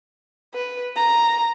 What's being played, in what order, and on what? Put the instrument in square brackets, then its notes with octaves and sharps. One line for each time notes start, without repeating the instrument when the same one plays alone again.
[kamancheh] B4
A#5